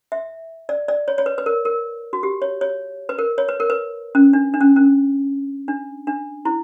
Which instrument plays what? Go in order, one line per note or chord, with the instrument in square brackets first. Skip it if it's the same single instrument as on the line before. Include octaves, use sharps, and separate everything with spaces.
[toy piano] E5
D5
D5
C#5
C#5
B4
B4
A#4
A#4
F#4
G4
C#5
C#5
B4
A#4
C#5
B4
A#4
B4
C#4
D4
D4
C#4
C#4
D4
D4
E4